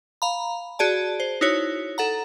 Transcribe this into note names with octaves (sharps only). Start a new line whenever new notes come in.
F5 A#5 B5
F#4 G#4 D5 A5
C5
D#4 E4 F#4 C#5
A4 F#5 A#5